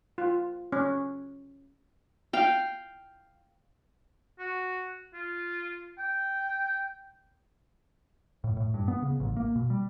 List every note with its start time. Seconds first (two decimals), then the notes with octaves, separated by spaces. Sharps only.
0.18 F4
0.72 C#4
2.33 F5 G5
4.39 F#4
5.14 F4
5.98 G5
8.44 A2
8.57 A2
8.74 G2
8.88 B3
9.02 C#3
9.20 A1
9.37 A#3
9.56 B2
9.70 G3